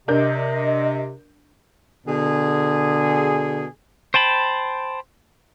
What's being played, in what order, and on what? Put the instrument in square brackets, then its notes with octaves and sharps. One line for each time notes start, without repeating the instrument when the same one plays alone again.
[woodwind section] C3 [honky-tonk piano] D4 A#4 G6 [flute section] D#5
[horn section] B2 D3 G#4
[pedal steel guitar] C5 G5 A5 B5